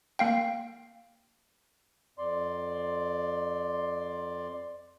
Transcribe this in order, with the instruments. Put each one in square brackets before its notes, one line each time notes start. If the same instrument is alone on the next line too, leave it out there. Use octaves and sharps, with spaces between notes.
[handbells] A#3 F5 G5
[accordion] F2 D5 C6